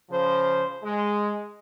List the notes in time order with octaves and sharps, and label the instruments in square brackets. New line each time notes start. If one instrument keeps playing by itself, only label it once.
[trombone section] C#3 F3 C5
G#3